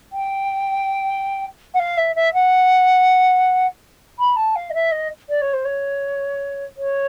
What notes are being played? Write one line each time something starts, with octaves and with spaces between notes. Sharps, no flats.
G5
F#5
F5
E5
E5
F#5
B5
A5
F5
D#5
E5
D#5
D5
C#5
C5
C#5
C#5